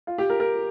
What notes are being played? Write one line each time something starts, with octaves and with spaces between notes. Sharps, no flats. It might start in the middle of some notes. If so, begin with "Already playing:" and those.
F4
G4
A#4
A#4